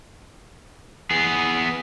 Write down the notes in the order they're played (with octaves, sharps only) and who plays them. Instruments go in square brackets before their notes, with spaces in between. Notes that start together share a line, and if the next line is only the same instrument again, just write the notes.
[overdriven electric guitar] B3 G#4